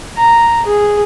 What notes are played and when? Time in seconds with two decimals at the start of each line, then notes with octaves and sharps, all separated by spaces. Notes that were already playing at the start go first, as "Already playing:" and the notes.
0.17 A#5
0.66 G#4